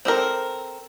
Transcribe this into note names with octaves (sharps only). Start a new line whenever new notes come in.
C4 A4 A#4